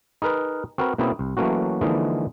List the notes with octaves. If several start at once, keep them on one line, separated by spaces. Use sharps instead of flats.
D#4 G#4 A#4 B4
C4 F#4 A#4 B4
B2 A#3 C4 C#4 E4 G#4
C2
E3 F#3 A3 A#3 C#4 F#4
D3 E3 F3 G#3 A#3 D#4